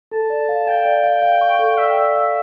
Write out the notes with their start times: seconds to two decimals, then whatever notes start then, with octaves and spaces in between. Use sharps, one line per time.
0.12 A4 A5
0.30 D5
0.49 F5
0.67 F5 G5
0.85 D5
1.04 F5
1.22 F5
1.41 C#6
1.59 A4
1.77 D5 E5
1.97 D5
2.15 F5